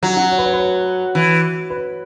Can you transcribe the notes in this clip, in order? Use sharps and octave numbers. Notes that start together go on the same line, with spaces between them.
F#3 F#4 F#5
F#4 F#5
C#5
B4
C#5
B4
C#5
E3
B4